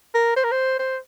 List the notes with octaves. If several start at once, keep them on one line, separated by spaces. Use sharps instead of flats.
A#4
C5
A#4
C5
C5